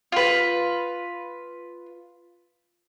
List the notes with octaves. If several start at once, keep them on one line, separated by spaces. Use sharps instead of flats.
F4 B4